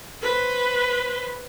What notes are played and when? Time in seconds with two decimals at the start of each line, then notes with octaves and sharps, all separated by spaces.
0.22 B4 C5